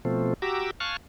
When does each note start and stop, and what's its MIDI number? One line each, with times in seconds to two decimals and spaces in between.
0.05 0.34 47
0.05 0.34 53
0.05 0.34 57
0.05 0.34 60
0.42 0.71 66
0.42 0.71 67
0.42 0.71 82
0.42 0.71 86
0.42 0.71 88
0.80 0.97 77
0.80 0.97 80
0.80 0.97 81
0.80 0.97 85
0.80 0.97 89
0.80 0.97 90